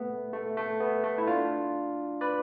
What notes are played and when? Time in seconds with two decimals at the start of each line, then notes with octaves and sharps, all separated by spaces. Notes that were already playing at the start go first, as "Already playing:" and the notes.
Already playing: A3 B3
0.33 A3
0.57 A3
0.80 B3
1.04 A3
1.18 E4
1.27 D4 F4
2.21 B4 D5